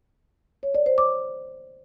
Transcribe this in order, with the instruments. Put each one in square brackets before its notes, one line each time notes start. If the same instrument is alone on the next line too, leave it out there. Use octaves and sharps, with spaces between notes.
[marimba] C#5
D5
C5
D6